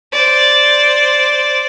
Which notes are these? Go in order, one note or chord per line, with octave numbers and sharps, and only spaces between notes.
C5 D5